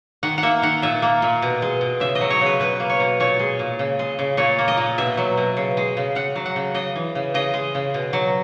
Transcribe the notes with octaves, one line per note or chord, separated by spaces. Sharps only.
D#3 F#5
F#5
A#3 E5
D#3 F#5
A#2 E5
A#3
A#2
B2
G#3
B2
C#3 E5
D#5
F#3
C#5
C#3
B4
B2 B4
A#3
C#5
B2
A#2 C#5
G#3
A#2
C#3
G#3
C#3
A#2 C#5
A#3
D#5
A#2
B2 E5
F#3
B2
C#3
G#3
C#3
C#3 F#5
F#3
F#5
C#3
C#3 D#5
E3
C#3
C#3 D#5
G#3
C#3
B2
F#3